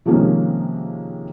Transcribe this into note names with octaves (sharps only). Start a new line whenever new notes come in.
C3 D#3 F3 G#3 A#3 C#4